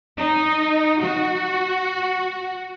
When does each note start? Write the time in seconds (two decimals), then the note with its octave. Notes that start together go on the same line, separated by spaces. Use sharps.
0.17 D#4
1.02 F#4